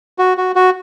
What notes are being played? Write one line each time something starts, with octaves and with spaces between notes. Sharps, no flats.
F#4
F#4
F#4